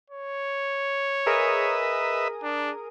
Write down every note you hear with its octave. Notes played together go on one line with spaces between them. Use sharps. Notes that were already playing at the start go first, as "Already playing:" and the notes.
C#5
G#4 A#4 B4 D#5 E5 D#6
D4